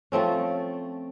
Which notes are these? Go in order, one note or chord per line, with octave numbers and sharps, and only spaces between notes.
F3 A3 C4 C#4